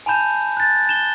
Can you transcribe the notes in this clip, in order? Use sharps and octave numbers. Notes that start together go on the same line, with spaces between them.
G#5 A5 B5 G6 E7
F#6 A6
E7 G7